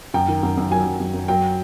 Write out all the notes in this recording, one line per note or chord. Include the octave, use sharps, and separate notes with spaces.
F#2 G5
D#3
F#2
F#2
F#3 G#5
F#2
F#2
F#2
F#3 G5